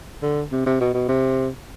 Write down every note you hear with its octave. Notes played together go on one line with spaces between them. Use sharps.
D3
C3
C3
B2
B2
C3